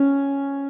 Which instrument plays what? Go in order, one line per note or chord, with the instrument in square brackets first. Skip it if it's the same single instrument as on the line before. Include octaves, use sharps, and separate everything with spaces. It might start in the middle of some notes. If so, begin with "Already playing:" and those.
Already playing: [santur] C#4